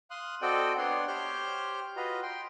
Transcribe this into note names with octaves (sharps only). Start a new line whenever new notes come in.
F5 C6 D#6 F#6
C4 F#4 A4 D5 D#5 G5
B3 D4 C#5 D5 F#5 C6
G4 C5 C#5 F6 G6
F4 F#4 B4 D#5 A#5
G5 C6